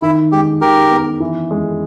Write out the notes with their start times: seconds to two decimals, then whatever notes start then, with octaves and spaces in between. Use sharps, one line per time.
0.02 D#3 E4
0.32 G#3 G4
0.61 D#3 G4 A#4
0.91 B3
1.20 E3
1.51 G#3